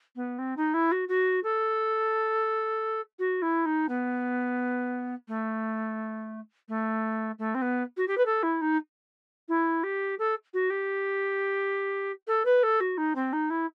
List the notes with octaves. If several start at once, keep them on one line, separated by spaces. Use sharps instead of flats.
B3
C4
D#4
E4
F#4
F#4
A4
F#4
E4
D#4
B3
A3
A3
A3
C4
B3
F#4
G4
B4
A4
E4
D#4
E4
G4
A4
F#4
G4
A4
B4
A4
F#4
D#4
C4
D#4
E4